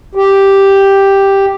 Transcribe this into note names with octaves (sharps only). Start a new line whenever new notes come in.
G4